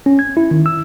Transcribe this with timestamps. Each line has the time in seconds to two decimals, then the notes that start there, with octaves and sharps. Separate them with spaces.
0.06 C#4
0.19 G#6
0.37 E4
0.51 D#3
0.66 E6